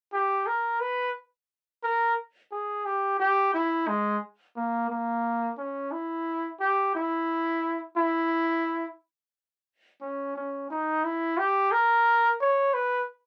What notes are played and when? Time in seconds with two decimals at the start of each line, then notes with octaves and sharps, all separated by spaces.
0.13 G4
0.46 A#4
0.80 B4
1.83 A#4
2.51 G#4
2.85 G4
3.19 G4
3.54 E4
3.88 G#3
4.56 A#3
4.90 A#3
5.58 C#4
5.91 E4
6.60 G4
6.95 E4
7.97 E4
10.01 C#4
10.36 C#4
10.70 D#4
11.04 E4
11.38 G4
11.72 A#4
12.40 C#5
12.74 B4